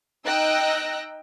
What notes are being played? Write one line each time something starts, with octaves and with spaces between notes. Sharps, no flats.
D#4 D#5 G5 E6 F#6 A#6